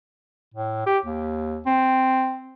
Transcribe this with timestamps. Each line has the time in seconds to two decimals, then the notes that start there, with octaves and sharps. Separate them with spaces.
0.54 A2
0.86 G4
1.05 D#2
1.66 C4